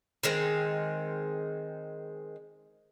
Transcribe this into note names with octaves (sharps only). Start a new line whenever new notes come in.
D#3 G#3 C4